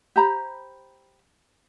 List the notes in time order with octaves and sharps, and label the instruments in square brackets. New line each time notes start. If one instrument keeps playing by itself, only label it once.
[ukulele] G4 C5 A#5 B5